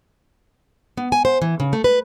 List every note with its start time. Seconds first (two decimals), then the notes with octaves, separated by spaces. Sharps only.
0.97 B3
1.12 G#5
1.25 C5
1.42 E3
1.60 C#3
1.73 A3
1.84 B4